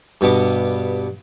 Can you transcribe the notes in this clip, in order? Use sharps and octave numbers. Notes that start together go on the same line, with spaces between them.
G2 B2 B3 D6